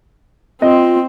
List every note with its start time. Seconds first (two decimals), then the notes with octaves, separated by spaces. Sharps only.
0.62 C4 F4 D#5